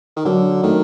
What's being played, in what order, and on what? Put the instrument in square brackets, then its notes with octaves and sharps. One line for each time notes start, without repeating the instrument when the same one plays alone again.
[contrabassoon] D#3
[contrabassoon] D3 [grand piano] F#3
[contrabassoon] D#3 [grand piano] A3